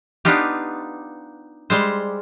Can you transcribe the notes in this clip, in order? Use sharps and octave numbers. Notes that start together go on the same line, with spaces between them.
B3 D4 D#4 F4 G4
G3 G#3 C5